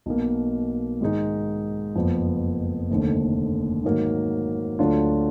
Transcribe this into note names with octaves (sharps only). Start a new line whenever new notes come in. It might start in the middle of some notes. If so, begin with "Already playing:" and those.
B1 B2 A#3
G#2 D#3 G#3 D#4
F#1 F2 F3 B3
F1 D#2 D3
G#2 D#3 F#3 A#3
D2 D3 F#3 D4 F4